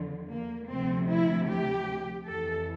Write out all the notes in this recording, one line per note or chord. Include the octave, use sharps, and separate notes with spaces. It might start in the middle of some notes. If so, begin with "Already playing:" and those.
Already playing: E2 D3 F3
A#3
D2 C3 F3 C4
E4
G4
F2 E3 A4